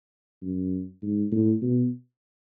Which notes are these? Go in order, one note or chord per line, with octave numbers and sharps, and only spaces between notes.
F#2
G#2
A2
B2